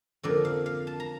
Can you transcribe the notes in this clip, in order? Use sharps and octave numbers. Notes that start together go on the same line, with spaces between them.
F2 D3 F3 A#3 D5
F5
F5
A5
A#5